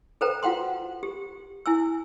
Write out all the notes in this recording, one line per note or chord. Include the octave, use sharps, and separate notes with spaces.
A4 B4 C5 G5 A#5
F4 F#4 F#5 G5 C6
G4
E4 G#5 E6